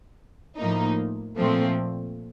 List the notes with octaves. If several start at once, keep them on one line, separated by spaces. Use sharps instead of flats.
A2 F3 A#3 D#4
A#2 F3 A3 C4